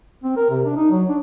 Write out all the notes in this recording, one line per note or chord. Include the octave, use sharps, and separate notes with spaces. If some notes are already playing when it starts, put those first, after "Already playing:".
C4
A#4
C3
D4
D#4
F#3
D4